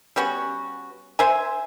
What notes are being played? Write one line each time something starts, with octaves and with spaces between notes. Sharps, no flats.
G3 B3 C#4 F#4
C5 E5 G#5